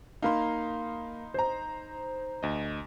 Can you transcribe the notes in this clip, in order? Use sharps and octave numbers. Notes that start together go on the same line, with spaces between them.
A#3 D#4 F5 B5 C6
C5 A#5
D2 D#5